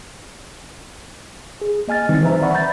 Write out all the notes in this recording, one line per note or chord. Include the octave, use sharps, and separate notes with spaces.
G#4
A#3 D#5 G#5 F6 A6
D#3 E3 G3 C4 D#4
B4 C5 E5 A#5
D5 E5 F#5 B5 C#6
A#5 B5 G6 A6